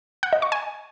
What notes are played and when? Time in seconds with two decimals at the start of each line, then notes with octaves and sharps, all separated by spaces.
0.23 F#5
0.33 D#5
0.42 C#6
0.52 G#5